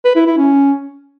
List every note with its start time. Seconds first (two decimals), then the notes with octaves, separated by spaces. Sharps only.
0.05 B4
0.16 E4
0.27 E4
0.37 C#4